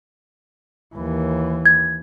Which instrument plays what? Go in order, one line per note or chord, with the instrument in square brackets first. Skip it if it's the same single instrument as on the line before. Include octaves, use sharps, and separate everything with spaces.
[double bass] D#2 E3
[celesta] G#6